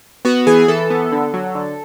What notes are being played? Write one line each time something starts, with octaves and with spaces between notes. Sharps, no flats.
B3 F#4
E3 G#4
E3 A4
B3
D3
F#3
D3